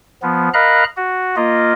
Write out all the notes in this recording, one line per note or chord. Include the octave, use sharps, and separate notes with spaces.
F3 B3
A#4 D#5 F5 A#5 B5 F#6
F#4
A#3 F4 D#5